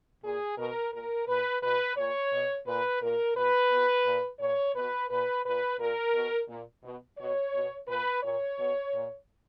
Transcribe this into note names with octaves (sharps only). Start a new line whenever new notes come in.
A#2 G#4
B2 A#4
A#2 A#4
A#2 B4
B2 B4
A#2 C#5
B2
A#2 B4
A#2 A#4
B2 B4
B2
A#2
A#2 C#5
B2 B4
A#2 B4
A#2 B4
A#2 A#4
B2
A#2
B2
B2 C#5
B2
A#2 B4
A#2 C#5
B2
A#2